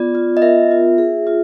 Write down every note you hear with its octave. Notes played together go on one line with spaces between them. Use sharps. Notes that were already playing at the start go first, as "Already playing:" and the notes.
Already playing: B3 F4 D5
F4
D#5
A#4 E5
F4
G#4
F4